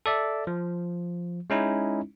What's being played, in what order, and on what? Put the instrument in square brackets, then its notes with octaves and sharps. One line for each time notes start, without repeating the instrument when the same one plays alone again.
[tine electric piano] A4 D5 E5
F3
G#3 C#4 D#4 E4